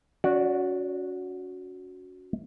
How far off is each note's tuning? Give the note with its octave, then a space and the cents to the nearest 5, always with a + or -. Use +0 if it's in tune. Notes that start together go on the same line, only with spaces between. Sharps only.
C#4 +35 F#4 -10 D5 +0